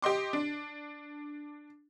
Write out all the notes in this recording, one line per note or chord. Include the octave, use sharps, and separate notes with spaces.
G4 D#5 C6 D6
D4